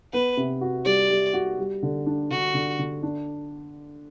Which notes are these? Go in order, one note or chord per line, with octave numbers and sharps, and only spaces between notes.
B3 B4
C3
F#4
G3 D5
G3
F#4
G3
D3
D4
D3 F#4
D3
D3
D4